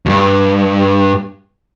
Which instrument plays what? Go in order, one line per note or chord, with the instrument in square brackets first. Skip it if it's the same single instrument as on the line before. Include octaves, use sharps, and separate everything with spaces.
[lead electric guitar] D2 G2